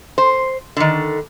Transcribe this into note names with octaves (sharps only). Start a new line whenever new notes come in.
C5
D3 D#3